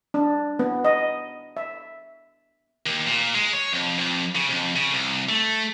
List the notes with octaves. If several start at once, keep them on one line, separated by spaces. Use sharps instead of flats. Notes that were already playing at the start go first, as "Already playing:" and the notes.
D4
B3
D#5
E5
D#2
A#2
G#3
C#5
F2
F2
C#3
F2
C#3
C2
A3